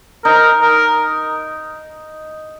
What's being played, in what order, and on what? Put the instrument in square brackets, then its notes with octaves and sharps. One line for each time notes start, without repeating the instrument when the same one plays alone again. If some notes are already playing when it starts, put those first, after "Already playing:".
[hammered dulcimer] D#4 [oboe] A#4
[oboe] A#4